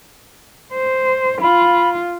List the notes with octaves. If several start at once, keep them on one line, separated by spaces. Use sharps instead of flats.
C5
F4 B5